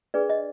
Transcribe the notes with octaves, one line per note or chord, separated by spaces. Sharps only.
D4 G#4 B4 D5
D#5